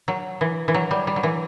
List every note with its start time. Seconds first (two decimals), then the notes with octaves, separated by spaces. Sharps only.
0.08 F#3
0.41 E3
0.68 E3
0.74 F#3
0.91 G3
1.07 G3
1.16 F#3
1.23 E3